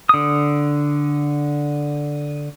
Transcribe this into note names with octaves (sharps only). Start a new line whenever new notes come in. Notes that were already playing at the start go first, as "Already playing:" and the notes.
D3 D#6